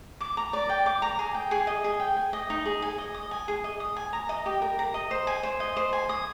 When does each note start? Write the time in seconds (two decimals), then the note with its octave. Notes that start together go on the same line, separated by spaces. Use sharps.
0.21 D6
0.37 A#5
0.53 D5
0.69 G5
0.86 D6
1.02 A#5
1.19 G#4
1.34 G5
1.51 G#4
1.67 D#5
1.84 G#4
2.00 G5
2.17 G#5
2.33 D#5
2.50 D#4
2.65 G#4
2.82 G#5
2.98 D#5
3.14 D#6
3.31 G#5
3.48 G#4
3.64 D#5
3.80 D#6
3.97 G#5
4.13 A#5
4.29 D#5
4.46 G4
4.62 A#4
4.79 A#5
4.94 D#5
5.11 C5
5.27 G#5
5.43 C5
5.60 D#5
5.77 C5
5.93 G#5
6.09 D#6